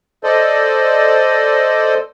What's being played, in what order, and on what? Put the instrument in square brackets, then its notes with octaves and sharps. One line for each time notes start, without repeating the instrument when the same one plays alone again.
[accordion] A4 C5 D5 D#5